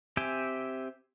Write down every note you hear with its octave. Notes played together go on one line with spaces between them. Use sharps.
C4 G4 E5 G5 G#5